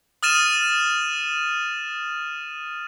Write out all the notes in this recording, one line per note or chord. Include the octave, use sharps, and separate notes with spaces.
D#6 F6 A6 D#7 E7